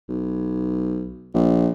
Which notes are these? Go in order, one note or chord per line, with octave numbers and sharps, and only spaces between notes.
B1
A#1